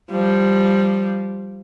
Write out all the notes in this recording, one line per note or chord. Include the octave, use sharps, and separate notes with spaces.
F3 G3